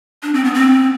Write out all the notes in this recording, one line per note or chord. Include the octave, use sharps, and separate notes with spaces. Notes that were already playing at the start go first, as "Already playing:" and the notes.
D4
C4
B3
C4